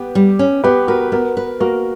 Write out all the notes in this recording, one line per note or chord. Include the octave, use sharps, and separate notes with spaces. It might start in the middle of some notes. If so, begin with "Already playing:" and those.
Already playing: B3 G4 B4
G3
C#4
B3 G4 B4
F#4 A#4 B4
B3 F#4 A#4
B4
A#3 F#4 A#4